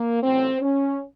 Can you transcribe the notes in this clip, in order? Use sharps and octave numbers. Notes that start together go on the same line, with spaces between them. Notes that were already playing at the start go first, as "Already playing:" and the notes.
Already playing: A#3
A1 A2 F#3 A3 C4
C#4